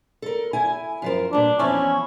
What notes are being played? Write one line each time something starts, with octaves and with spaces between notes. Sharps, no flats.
A4 A#4
E4 G#5
F#2 F3 A#4
G2 A#2 D4
E2 F3 C#4 E4